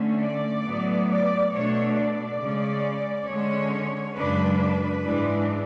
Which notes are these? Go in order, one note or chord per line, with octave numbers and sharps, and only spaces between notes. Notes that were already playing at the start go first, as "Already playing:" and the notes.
Already playing: D3 A3 C#4
D5
A2 F#3 B3
D5
B2 A3 D4 C#5
D5
C#3 G#3 C#4
D3 G#3 C#4 C#5
F#2 C#3 G#3 D4 B4
B4
G#2 E3 G#3 D4